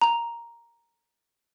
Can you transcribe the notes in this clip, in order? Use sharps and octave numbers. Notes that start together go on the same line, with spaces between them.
A#5 F7